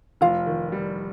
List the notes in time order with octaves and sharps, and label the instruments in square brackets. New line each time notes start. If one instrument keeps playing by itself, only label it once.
[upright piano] F1 [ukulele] F4 F5
[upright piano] D#3
G3